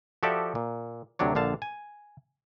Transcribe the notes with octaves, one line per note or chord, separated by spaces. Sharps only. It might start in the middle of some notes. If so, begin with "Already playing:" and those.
F3 F#4 G4 A4 D5 E5
A#2
D2 C3 F#3 D4 C#5
A#1 D3 F5 A5
G#5